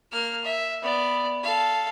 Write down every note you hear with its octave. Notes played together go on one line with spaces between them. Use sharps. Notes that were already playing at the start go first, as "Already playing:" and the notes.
A#3 F6
E5
B3 D5
A4 F5